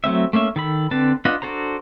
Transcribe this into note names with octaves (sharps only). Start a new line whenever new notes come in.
F#3 A3 C4 E5
A3 A#3 C#4 E5
D#3 A4 B5
D3 C4 B4 A5
D4 F4 B4 D#5 F#5
D4 F#4 A4 C5 A#5